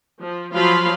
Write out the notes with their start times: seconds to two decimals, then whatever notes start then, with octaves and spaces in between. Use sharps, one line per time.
0.20 F3
0.54 F3 F#3 F4 F5 B5 C6